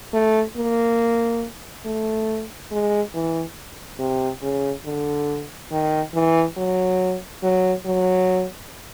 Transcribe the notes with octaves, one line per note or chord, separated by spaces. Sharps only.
A3
A#3
A3
G#3
E3
C3
C#3
D3
D#3
E3
F#3
F#3
F#3